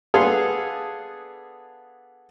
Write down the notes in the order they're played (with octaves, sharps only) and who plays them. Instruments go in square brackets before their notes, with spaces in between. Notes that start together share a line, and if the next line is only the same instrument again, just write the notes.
[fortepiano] B3 D4 G#4 A4 F5 C6